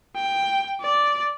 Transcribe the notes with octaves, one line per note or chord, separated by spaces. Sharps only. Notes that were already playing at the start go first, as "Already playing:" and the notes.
G5
D5